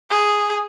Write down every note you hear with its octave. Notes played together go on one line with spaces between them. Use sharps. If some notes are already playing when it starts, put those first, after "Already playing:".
G#4